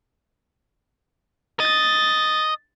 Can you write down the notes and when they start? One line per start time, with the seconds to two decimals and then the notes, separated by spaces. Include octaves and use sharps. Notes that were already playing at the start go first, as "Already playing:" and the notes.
1.60 D#5 A6